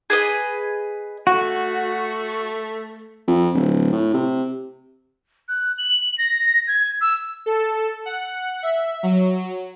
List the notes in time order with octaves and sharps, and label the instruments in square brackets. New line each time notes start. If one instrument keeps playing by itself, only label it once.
[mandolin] G#4 B4 D#5
[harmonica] A3 [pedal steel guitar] F#4
[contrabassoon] F2
D1
A2
C3
[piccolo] F#6
F#7
A#6
G#6
E6
[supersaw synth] A4
F#5
E5
F#3